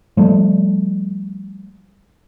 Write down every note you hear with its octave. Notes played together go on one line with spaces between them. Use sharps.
F3 G3 A3